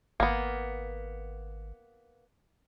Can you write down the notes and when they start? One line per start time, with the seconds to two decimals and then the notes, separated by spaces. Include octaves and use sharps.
0.20 G#1 A#3 B3